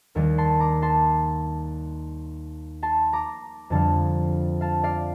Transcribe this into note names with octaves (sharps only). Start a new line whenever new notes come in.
D#2 D#3 G3 A#4 D5
A5 C6
A#5 D6
A5 C6
A5 C6
A#5 D6
F2 D3 G3 F5 A5
F5 A5
D5 F5